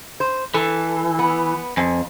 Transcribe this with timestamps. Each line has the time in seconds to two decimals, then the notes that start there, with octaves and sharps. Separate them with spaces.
0.20 C5
0.54 E3 A4
1.19 B3
1.77 F2 G#5